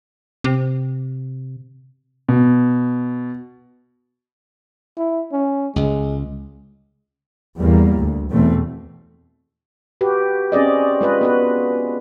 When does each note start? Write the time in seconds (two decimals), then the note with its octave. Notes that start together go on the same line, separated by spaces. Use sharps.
0.44 C3
2.29 B2
4.97 E4
5.32 C#4
5.76 C#2 G#3
7.59 E2 G3 A#3
7.98 D2
8.31 E2 B2 A3 C4
10.01 F#4 G4 B4
10.52 C4 C#4 G#4 D5 D#5
11.01 G#3 F4 B4 D#5
11.21 B3 F#4 B4